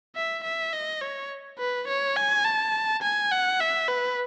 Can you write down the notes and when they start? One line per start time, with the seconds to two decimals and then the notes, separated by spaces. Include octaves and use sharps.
0.16 E5
0.44 E5
0.73 D#5
1.01 C#5
1.58 B4
1.88 C#5
2.16 G#5
2.44 A5
3.02 G#5
3.31 F#5
3.60 E5
3.88 B4